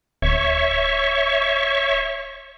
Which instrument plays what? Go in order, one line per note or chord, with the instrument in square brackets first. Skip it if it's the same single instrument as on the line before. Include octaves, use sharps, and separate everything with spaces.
[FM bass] D1 [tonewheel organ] C#5 E5 C#6